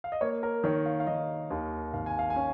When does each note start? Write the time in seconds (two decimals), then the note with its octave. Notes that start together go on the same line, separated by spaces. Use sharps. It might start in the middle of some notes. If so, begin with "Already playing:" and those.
0.04 F5
0.12 D#5
0.21 A#3 C#5
0.43 A#4
0.64 D#3 C#5
0.86 F5
1.00 F5
1.07 D#3 D#5
1.51 D#2
1.93 G#1 F5
2.06 G#5
2.19 F5
2.30 G#5
2.36 C#4